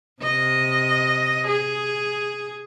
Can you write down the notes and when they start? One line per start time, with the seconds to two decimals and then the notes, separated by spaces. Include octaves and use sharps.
0.22 C3 D#5
1.47 G#4